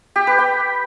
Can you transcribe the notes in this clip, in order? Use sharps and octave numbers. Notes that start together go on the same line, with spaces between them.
G4
B4
G5